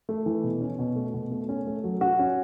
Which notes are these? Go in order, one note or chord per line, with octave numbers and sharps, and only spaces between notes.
A3
E3
B2
C#4
B2
A3
B2
A3
C#4
A3
F#3
F#4
C#4